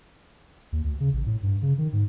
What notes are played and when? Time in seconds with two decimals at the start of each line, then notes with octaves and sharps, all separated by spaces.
0.72 D#2
0.84 D2
1.00 C#3
1.13 A1
1.26 A2
1.43 G2
1.62 C#3
1.78 D#3
1.93 G#2